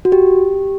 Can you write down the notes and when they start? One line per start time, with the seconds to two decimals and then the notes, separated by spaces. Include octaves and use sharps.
0.05 F#4
0.12 G4